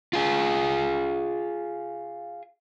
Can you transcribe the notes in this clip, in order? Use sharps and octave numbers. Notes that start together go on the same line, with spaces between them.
F4 G#4